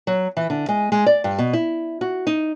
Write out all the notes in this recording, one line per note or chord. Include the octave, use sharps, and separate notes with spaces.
F#3
E3
D3
G#3
G#3
D5
G2
B2
E4
F#4
D#4